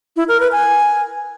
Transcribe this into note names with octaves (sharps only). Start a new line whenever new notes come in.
E4
A#4
B4
G#5